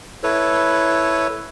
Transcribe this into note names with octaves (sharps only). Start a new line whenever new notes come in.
E4 A4 B4 C#5